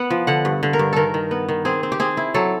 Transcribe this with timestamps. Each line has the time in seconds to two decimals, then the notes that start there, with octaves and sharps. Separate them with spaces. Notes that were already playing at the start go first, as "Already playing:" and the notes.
Already playing: B3 F#5
0.10 F3
0.27 D3 F#5
0.45 G2
0.63 D3
0.73 A#4
0.79 G2
0.93 D#3 A4 A#4
1.14 D#3
1.31 B3
1.49 D#3
1.65 C4 G#4
1.83 C4
1.92 G4
2.00 C4 G#4
2.17 E4
2.34 F#3 A4